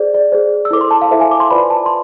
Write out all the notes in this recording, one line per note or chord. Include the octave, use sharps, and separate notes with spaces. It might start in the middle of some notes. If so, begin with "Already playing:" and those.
Already playing: G#4 C5 D5
D5
G#4 C5
E6
E4 A4 D6
C5 C6
A5
F5
E4 A4 C5 E5
G#5
D6
C6
F4 B4 D5 B5
A5
C6